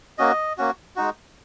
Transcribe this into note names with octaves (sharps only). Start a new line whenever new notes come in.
A#3 C#4 F#4 D#5
A#3 C#4 F#4
G#3 D#4 F#4